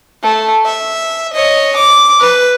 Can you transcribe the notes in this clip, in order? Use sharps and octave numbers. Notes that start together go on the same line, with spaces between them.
A3
E5
C#5 D#5
D6
B4